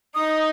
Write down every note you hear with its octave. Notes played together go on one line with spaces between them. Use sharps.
D#4 D#6